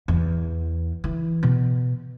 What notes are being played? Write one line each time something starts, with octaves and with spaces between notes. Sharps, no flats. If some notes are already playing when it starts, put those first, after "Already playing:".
E2
E3
B2